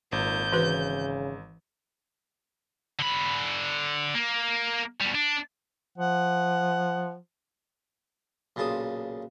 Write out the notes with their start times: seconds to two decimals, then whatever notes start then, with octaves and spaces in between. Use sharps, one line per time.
0.12 G#1 A#2 G6
0.53 C#3 E3 F#4 B4
2.99 D3 B5
4.15 A#3
5.01 B2 G3
5.15 D4
5.98 F3 F#5
8.56 B1 A#2 C#3 A5 C6 D#6